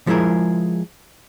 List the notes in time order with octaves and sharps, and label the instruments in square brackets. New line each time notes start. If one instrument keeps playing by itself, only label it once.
[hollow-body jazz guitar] F3 G#3 E4 G#4 A#4